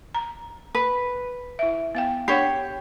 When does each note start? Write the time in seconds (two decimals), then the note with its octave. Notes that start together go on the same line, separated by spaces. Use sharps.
0.15 A#5
0.75 B4
1.59 E4 E5
1.95 B3 F5 G5
2.28 D4 G4 C#5 F#5